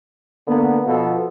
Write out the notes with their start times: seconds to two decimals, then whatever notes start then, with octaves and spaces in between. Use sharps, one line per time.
0.48 D3 A#3 B3
0.86 B2 F3 B3 F4 A4